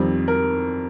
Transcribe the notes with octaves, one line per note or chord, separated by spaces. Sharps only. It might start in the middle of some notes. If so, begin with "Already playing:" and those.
Already playing: F2 D#3 G3 C4
A#4